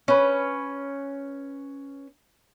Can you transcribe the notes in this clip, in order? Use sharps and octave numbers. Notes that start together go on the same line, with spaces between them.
C#4 B4